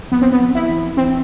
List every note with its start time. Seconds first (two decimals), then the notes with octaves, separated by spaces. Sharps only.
0.12 F3 B3
0.22 C4
0.32 B3
0.40 F3
0.55 E4
0.68 E3
0.97 E3 C4